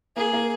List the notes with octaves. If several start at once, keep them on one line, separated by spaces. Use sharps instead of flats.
A#3 G#4
A#3